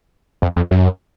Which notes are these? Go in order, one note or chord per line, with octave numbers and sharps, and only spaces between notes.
F2
F2
F#2